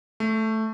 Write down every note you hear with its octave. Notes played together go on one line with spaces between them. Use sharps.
A3